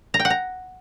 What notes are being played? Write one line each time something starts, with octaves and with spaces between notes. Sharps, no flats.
A#5
G5
F#5
A#5